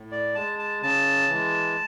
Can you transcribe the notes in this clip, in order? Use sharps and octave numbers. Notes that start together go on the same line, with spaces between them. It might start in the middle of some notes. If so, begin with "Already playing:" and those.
Already playing: A2
D5
G#3 A5
A5
C#3 A5
E3 G#3